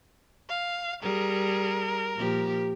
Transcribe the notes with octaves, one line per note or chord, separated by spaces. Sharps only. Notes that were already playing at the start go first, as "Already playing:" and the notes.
F5
G3 G#4 A#4
A#2 F3 G4